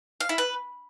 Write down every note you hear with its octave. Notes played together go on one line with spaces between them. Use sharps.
F5
E4
B4